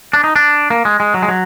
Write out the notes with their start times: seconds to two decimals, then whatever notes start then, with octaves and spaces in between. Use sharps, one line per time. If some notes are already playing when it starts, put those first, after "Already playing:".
0.13 D4
0.24 D#4
0.36 D4
0.70 A#3
0.85 G#3
1.00 G#3
1.14 F#3
1.23 G#3
1.28 F#3